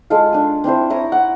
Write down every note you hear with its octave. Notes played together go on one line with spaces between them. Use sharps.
G#3 F4 A4 F5
D4 G#5
C4 D4 E4 C5
E4 C#5 A#5 D#6
F#5